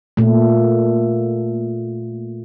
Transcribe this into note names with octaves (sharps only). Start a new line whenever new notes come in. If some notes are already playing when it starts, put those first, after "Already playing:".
A#2 A3